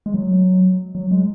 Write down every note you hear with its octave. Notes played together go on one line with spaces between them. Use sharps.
G#3
F#3
F#3
G#3